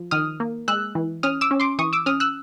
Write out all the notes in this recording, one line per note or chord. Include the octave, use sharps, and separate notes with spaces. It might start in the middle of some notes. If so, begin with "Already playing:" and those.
Already playing: F3
D#3 D#6 F6
A#3
G#3 E6 F#6
E3
C#4 D#6 F6
D6 E6
C#4
C6 D6
E3 C#6 D#6
D6 E6
C#4 D#6 F6
E6 F#6